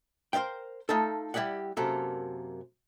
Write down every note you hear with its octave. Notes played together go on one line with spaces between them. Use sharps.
A#4 C5 D#5 F5 G5
A3 D#4 F4 A4
G3 E4 G4 D5 F#5
F#2 C3 A#3 A4